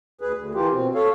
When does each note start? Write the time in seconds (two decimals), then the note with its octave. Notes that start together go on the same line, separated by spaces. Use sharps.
0.21 D2 G#4 B4
0.37 D2
0.55 E3 A#3 F4 G4
0.72 B2 C4
0.95 A4 C#5 F5